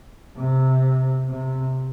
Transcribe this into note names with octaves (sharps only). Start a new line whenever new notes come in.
C3
C3